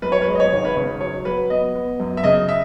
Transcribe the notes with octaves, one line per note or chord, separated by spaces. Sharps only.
F#2 B4
C#5
B4
G#3
D#5
C#5
G#1
B4
C#3 C#5
F#3 C#5
F#3 B4
B3 D#5
B3
F#2
E5
C#3 D#5
E5